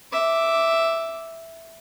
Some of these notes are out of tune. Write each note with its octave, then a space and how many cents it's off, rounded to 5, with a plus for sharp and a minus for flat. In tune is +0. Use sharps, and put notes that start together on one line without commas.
E5 +0 D6 +0